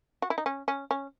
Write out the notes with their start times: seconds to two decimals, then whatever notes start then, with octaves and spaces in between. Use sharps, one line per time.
0.22 F#4
0.30 E4
0.38 D#4
0.46 C#4
0.68 C#4
0.91 C#4